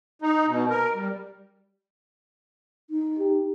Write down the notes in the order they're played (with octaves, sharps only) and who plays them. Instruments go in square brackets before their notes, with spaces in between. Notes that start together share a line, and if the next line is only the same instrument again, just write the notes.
[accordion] D#4
B2
A#4
G3
[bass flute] D#4
[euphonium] G4